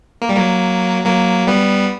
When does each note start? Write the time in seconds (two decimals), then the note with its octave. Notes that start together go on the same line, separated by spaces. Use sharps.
0.22 A#3
0.29 G3
0.36 F#3 A#3
1.06 F#3 A#3
1.47 G3 B3